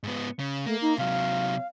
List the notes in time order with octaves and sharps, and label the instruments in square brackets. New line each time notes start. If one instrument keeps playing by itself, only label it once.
[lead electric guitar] G#2 B3
C#3
[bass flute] A3 [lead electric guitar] A#3
[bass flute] D#4
[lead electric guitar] C3 F#3 [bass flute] F5